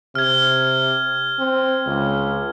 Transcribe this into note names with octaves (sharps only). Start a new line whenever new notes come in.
C3 F6 G#6
C4
C#2